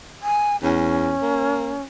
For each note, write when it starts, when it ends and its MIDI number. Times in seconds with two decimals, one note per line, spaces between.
0.22 0.56 80
0.63 1.16 40
0.63 1.83 61
1.22 1.76 58